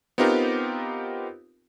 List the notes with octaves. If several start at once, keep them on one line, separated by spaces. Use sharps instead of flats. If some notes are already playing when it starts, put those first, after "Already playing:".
B3 C4 D#4 F4 G4 A#4